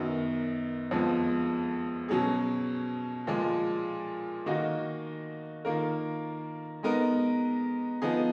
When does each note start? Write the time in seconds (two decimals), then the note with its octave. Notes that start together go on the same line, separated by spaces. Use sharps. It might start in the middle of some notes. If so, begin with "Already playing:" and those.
Already playing: F#2 D#3 F#3 B3 D#4
0.91 F2 F3 G#3 B3
2.09 B2 F#3 C#4 G#4
3.27 A#2 F3 G#3
4.46 D#3 A#3 D#4 F#4
5.65 D#3 A#3 F4 A#4
6.83 G#3 B3 D#4 A#4
8.02 F3 B3 D#4 G#4